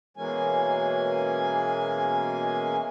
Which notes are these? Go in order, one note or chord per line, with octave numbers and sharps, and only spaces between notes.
B2 E3 G#3 A#3 C#4 G#5